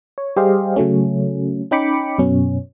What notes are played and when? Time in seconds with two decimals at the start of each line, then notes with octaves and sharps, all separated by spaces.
0.18 C#5
0.36 G3 G4 G#4 C5 D#5 F5
0.76 C#3 F#3 A3 C#4
1.71 C#4 D#4 G5 B5 D6 C#7
2.19 F#2 B2 C#4